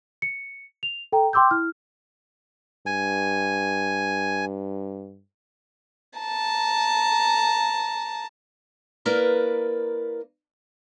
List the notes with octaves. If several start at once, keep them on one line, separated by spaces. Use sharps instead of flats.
C#7
F7
A4 G5 A#5
G5 C6 D6 E6 G6
E4 F6
G2 G#5
A5 A#5
A#3 E4 A#4 B4 D5